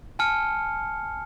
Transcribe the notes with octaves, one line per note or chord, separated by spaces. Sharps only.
G#5 A5 F6 C#7